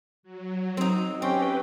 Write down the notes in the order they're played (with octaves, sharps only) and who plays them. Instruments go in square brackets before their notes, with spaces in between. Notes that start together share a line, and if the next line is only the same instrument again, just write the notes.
[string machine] F#3
[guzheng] C4 D#4
[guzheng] C4 [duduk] C#4 [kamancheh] G4 G5 [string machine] B4